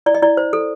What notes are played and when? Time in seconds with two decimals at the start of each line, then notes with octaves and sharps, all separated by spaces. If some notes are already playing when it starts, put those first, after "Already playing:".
0.06 E4 D5
0.14 D#5
0.22 E4 D5
0.37 C5
0.53 A4